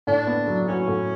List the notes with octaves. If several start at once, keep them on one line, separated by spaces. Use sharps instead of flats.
A2 D4
B3
F#3
C#4 F#4
A2